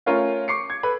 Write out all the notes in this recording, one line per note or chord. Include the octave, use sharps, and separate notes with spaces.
A3 C#4 F4 A#4 C#5 F5
C#6 D6 C7 C#7
G#6
A4 B4 B5